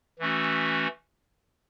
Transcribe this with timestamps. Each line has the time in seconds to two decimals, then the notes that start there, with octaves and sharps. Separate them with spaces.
0.19 E3 A3 C#4 F#4